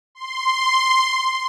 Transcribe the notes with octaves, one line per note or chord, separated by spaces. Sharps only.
C6